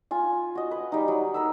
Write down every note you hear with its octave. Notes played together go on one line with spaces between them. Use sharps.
F4 G#5
F#4 D#5
B4
G3 D#4
F#3
A#4 B4 E6